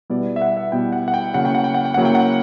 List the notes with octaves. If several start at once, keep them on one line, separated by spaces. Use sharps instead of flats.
B2 G3 B3 E4 D5
E5
F#5
E5
B2 G3 B3 E4 G5
F#5
F#5
G5
C#3 F#3 A#3 E4 F#5
G5
F#5
G5
F#5
G5
C#3 F#3 A#3 E4 F#5
G5
F#5